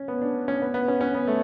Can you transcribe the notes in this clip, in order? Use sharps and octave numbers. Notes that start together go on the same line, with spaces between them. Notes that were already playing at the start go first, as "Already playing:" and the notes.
Already playing: C#4
B3
D4
C#4
B3
B3
C#4
C#4
B3
A3